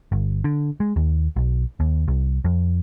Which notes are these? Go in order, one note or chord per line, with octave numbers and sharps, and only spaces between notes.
G1
D3
G#3
D#2
B1
D#2
C2
F2